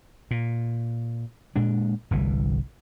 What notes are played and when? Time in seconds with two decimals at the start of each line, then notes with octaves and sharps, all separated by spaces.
0.31 A#2
1.56 A#2 G#3 D4
2.11 G1 C2 E3